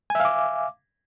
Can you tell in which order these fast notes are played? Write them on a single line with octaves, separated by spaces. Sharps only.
G#5 E5 F5 D6